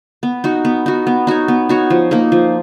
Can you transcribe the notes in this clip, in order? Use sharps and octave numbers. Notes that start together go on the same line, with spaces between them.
B3
D#4 F#4
B3
D#4 F#4
B3
D#4 F#4 C#5
B3
D#4 F#4 C#5
F3
A#3 D#4 A#4
F3